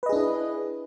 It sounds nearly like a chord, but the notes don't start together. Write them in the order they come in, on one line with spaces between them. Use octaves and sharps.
B4 D#5 G#4 D4 E4